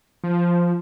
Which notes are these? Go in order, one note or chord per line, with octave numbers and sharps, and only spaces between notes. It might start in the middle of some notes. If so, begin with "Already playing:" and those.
F3